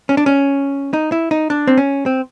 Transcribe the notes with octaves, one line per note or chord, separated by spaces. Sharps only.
C#4
D4
C#4
D#4
E4
D#4
D4
C4
C#4
C4